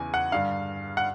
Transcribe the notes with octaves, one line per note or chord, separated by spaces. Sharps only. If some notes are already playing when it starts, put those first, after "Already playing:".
Already playing: E2 C#3 E3 G#5
F#5
G2 D3 F5
F#5